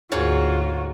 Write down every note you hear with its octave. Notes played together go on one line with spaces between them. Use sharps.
D2 G#2 F4 F#4 G#4 C#5